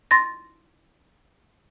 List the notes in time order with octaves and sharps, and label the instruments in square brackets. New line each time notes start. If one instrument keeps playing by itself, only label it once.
[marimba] C6 A6 A#6